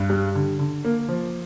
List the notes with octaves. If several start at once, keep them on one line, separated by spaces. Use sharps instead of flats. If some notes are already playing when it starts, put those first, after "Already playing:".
Already playing: G2
G3
D3
D3
A#3
F3